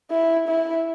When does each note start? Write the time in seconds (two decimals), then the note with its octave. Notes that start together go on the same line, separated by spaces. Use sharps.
0.11 E4
0.48 E4